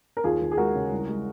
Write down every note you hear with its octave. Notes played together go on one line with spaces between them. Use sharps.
A#4
D#2 F4 G#4
D#2
G#4
G#3 F#4 A#4
C#3
C2
G#3